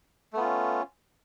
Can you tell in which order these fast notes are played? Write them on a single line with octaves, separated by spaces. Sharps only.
A3 B3 F4 C#4